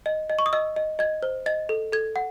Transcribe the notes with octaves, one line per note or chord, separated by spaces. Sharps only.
D#5
D#5
C#6
D#6
D#5 E6
D#5
D#5 G#6
C5
D#5 A6
A4
A4 G#6
F#5